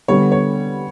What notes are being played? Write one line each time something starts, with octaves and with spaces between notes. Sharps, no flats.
D3 G3 B3 C#5
C#5